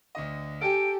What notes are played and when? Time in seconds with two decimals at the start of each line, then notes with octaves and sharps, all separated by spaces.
0.15 D2 D3 D#5
0.61 G4 A4 G5 G#5 D7